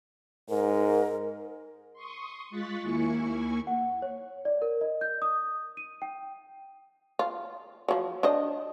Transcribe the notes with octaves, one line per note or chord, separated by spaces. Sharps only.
G#2 A#4
C6 C#6 D#6
G#3 F4 C#6 F#6 A6 B6
D#2 A#3 E4 G#5 C#6 C#7
F#5
C#5
D5
A#4
D#5
G6
D#6
D#7
G5
F4
F3 F#3
D4 C5 D#5